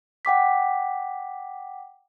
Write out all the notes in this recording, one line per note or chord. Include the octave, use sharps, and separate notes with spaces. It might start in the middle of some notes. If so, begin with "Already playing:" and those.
F#5 G5 D6 B6